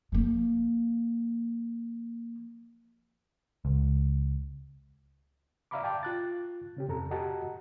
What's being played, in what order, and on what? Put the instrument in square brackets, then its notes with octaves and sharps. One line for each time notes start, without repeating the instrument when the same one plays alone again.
[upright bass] F3 A#3
[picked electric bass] C#2
[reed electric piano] D5 E5 F5 A#5 B5 D6
G5 A5 D6
F4 F#6 A6
C#3 C#4 G4
F2 C3 A4 A#5
F#4 G4 D#5 F#5 A5 A#5